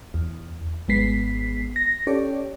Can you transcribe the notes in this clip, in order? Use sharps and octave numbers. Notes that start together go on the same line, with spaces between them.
E2
G#1 G#3 B3 B6 C7
A#6
C#4 G4 A4 C#5 D5